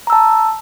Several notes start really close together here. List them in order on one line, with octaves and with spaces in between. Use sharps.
A#5 E6 A5